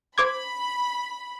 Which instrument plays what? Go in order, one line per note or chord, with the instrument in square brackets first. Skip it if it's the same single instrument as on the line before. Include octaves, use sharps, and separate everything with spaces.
[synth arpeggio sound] C5 D6 G#6 [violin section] B5